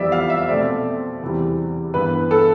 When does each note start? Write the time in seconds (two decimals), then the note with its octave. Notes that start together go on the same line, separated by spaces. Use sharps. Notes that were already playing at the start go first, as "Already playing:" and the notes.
Already playing: F2 E3 G3 B3 D5 E5
0.12 F5
0.30 E5
0.49 B2 A3 C4 D5
1.22 E2 C3 E3 G3
1.94 G2 E3 B3 B4
2.31 A4